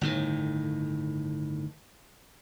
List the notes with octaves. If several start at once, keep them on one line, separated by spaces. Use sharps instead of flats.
G1 A2 D#3